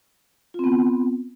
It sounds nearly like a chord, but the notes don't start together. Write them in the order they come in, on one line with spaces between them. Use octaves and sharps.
F4 C4 B3